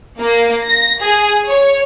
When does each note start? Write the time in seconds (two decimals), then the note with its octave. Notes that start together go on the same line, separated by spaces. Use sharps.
0.20 A#3
0.64 A#6
1.02 G#4
1.49 C#5